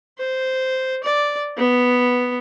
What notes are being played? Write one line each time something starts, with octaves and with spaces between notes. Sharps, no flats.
C5
D5
B3